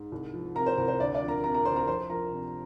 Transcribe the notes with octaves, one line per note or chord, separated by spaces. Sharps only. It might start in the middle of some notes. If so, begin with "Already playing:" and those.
Already playing: G#2
C2
F3
C3 A#4 A#5
C5
C2 A#4
C5
D2 D4 D5
D4 D5
F3
A#4 A#5
C3 A#4 A#5
A#4 A#5
D2 C5 C6
A#4 A#5
F2 C5 C6
F3 A#4 A#5
C3